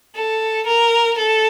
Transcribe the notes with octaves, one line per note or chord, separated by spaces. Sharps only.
A4
A#4
A4